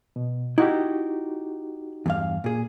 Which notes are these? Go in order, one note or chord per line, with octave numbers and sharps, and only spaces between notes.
B2
D#4 E4 F#4 G4
E2 G2 F5
A#2 G#4